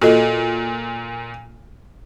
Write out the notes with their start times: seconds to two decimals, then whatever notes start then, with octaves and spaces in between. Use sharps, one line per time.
0.02 A#2 F#4 A4 D#5